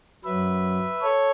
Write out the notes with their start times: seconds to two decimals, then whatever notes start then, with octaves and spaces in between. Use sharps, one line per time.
0.24 F#2 F#3 B4 E5
1.01 A4 C#5